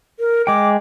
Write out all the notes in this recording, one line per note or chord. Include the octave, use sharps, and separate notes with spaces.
A#4
G#3 G5 D6